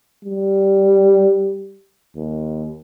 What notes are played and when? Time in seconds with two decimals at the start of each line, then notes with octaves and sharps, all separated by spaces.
0.25 G3
2.16 D#2